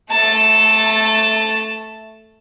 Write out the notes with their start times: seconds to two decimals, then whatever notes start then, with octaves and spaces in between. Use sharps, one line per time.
0.11 A3 A5